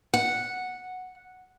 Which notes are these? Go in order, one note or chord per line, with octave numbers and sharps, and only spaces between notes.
F#5